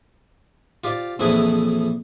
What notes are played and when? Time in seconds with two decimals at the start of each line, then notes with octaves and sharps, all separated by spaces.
0.84 F4 G4 C5 D5
1.19 A#1 F2 E3 E4 G#4 B4